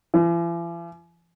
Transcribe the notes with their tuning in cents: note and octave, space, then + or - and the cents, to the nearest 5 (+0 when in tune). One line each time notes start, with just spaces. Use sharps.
E3 +45